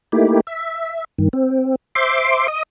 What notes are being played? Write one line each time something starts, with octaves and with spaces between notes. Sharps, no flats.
A3 A#3 D#4 E4 G4
E5
G2 D#3
C4
C5 E5 C6 D6
D#5 D#6